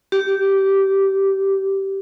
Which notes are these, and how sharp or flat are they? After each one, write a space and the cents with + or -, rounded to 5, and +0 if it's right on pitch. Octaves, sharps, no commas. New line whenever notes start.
G4 -15